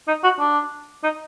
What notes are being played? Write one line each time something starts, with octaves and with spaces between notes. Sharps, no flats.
D#4
F#4
D4
D#4